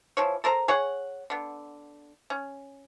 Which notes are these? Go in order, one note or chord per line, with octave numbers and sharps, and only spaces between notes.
E3 F3 C#5
A4 A#4 C5 A#5
G#4 C#5 F#5
D3 B3
C#4